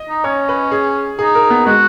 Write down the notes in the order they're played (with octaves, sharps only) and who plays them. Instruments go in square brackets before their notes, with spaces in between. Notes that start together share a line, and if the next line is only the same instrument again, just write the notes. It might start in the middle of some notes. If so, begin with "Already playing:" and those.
Already playing: [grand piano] D#5
[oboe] D#4
[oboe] C#4 [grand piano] C#5
[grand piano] B4
G#4
[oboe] D#4 [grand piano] G#4
[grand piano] A#4
B3
[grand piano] G#3 [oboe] F#4